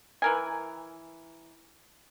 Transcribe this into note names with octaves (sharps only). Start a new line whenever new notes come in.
E3 A#4 G#5